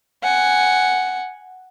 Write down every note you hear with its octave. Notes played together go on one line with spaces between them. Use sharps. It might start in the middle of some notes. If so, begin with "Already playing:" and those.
F#5 G#5